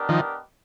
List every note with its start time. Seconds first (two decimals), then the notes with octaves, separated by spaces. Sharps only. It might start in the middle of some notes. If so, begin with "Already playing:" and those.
Already playing: B3 D4 G4 A#4 D#5
0.09 D#3 F3